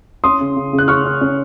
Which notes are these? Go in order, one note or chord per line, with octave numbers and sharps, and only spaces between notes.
C#4 C6 D#6
C#3
C#3
C#3
F#6
C#4 C#6 F6
C#4
C#4